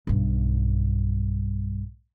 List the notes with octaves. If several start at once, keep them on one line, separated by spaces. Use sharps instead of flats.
B1 G2